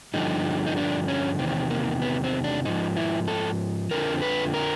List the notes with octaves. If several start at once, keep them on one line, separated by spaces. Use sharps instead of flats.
G2 D3 F3 D#4
D#4
D4
C#4
E2 C3 D#3 C4
A#3
B3
C4
D4
G#2 F3 D#4
E4
A4
F2 D3 F3 A#4
B4
A#4